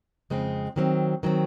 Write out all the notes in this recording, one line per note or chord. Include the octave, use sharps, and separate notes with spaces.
F2 C#3 G#3 C4
D#3 F#3 C4
D#3 F#3 C4